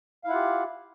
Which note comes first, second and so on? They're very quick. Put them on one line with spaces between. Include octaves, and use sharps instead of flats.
F5 E4 F#5 F4 G4